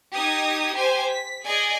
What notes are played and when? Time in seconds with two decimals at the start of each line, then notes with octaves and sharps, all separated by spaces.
0.13 D#4 G4 D#6 G#6
0.74 G4 C5 G#5
1.08 B6
1.45 G#4 D5 D#5 G#5